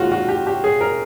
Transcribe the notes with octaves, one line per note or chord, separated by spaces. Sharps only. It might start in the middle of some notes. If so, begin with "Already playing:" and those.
Already playing: D#2 D#3 G#3 F4 F#4
F#4
G4
G4
G#4
A#4